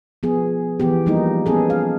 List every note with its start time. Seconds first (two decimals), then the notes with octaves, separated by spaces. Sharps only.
0.23 F3 B3 G#4
0.80 E3 B3 G4
1.06 F3 G3 A#3 B3 D#4
1.46 B3 C#4 G#4 A4
1.70 F5